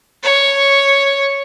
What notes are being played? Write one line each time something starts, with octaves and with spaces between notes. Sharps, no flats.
C#5